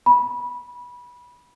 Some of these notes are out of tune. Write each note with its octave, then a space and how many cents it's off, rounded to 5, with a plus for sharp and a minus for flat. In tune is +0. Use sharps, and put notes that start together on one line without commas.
B5 -20